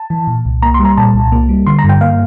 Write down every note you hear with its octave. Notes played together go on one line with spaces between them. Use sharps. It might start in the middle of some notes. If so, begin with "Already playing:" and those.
Already playing: A5
E3
A#2
C2
A#3 A#5
C6
G3
A#5
A#2 A5
C2
A#3
G3
D3 C6
A#5
G2
G5
A#3 F5